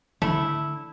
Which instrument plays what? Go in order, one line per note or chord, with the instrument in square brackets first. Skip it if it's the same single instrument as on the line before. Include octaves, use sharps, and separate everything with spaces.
[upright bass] D3 [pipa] A3 E4